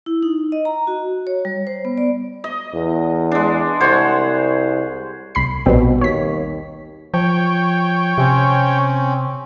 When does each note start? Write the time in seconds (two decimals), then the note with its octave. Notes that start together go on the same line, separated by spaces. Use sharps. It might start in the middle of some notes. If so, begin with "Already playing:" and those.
0.06 E4
0.23 D#4
0.52 D#5
0.65 A#5
0.87 F#4
1.27 C#5
1.45 G3
1.67 C5
1.85 B3
1.98 D5
2.44 D#5
2.74 E2
3.32 G#3 D4
3.80 C2 C5 C#5 F#5
5.35 C2 B5 C7
5.66 A#1 B2 G3 C4
6.01 D#2 C#5 B6
7.14 F3 C#5 G5
8.18 C3 C4 C#4